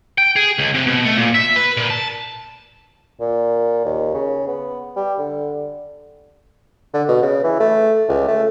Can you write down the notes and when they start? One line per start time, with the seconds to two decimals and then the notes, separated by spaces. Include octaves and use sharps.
0.18 G5
0.36 G#4
0.58 C#2
0.74 C3
0.87 B2
1.05 A3
1.17 A#2
1.34 E5
1.56 B4
1.77 A#2
1.90 A5
3.20 A#2
3.85 D#2
4.14 C#3
4.48 B3
4.96 G3
5.19 D3
6.94 D3
7.09 B2
7.23 C#3
7.44 E3
7.60 A3
8.09 C#2
8.28 A3